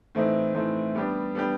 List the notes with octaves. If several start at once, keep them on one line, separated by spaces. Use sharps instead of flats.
A2 E3 A3 C4 D#4
A2 E3 A3 C4 D#4
G3 B3 D4 G4
G3 B3 D4 G4